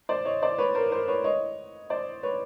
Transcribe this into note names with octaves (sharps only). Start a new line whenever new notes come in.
C5 D5
C#5 D#5
C5 D5
B4 C#5
A#4 C5
A#4 C5
B4 C#5
C#5 D#5
C5 D5
B4 C#5